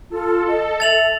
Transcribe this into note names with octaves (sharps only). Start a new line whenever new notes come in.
F4 A4
D#5
E5 A6 F7 F#7